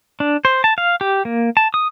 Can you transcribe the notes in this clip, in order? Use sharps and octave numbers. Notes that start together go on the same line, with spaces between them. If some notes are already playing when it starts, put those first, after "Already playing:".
D4
C5
A5
F5
G4
A#3
A5
D#6